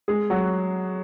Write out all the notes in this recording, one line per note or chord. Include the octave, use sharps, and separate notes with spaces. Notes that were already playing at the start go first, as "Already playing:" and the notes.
G#3 G#4
F#3 F#4